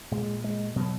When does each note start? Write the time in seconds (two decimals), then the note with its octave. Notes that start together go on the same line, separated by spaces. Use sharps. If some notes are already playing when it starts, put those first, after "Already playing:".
0.11 A#2 G#3
0.44 G#3
0.76 B2 F#3